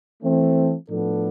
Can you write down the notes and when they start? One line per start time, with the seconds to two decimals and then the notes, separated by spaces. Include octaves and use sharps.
0.23 E3 A3 C4
0.88 A2 F3 B3 D4 A4